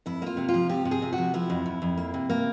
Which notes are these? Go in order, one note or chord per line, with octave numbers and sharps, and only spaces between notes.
F2 E4
A#3 F4
C3
F4
F3
C3 G4
C3
G#4
C3
F#4
F3
F3 E4
F2
F2
F2
A#3
C3
A#3